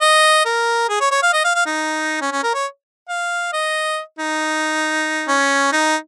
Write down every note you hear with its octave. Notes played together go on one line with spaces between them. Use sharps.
D#5
A#4
G#4
C#5
C#5
F5
D#5
F5
F5
D#4
C#4
C#4
A#4
C#5
F5
D#5
D#4
C#4
D#4